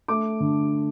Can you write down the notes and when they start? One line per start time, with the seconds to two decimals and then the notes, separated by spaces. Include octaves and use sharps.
0.08 A3 D6
0.40 D3